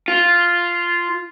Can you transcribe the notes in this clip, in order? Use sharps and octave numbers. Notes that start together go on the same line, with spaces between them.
F4